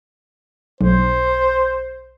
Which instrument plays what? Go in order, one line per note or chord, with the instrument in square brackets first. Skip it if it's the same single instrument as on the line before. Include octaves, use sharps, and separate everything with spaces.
[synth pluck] B1 [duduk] C5